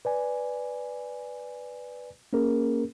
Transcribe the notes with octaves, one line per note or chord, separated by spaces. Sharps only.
B4 D5 G#5
A#3 C#4 G#4 A#4